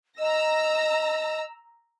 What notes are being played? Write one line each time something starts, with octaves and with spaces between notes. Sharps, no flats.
D#5 A#5 E6 A#6